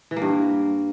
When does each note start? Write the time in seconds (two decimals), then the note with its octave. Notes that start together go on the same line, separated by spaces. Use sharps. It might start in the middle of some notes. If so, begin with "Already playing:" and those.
0.11 E3
0.16 A#3
0.22 G2